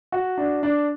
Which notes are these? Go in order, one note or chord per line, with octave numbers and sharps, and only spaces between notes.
F#4
D4
D4